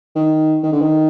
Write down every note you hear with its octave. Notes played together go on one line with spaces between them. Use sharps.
D#3
D#3
D3
D#3